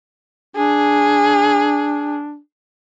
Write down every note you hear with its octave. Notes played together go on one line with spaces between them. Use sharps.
D4 G#4